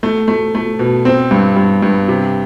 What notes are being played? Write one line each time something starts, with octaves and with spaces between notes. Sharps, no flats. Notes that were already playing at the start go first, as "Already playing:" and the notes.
A3
A3
A3
B2
C4
G2
G2
G2
C3